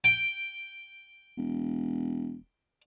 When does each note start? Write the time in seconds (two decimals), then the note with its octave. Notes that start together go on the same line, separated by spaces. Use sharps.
0.04 G5
1.38 E1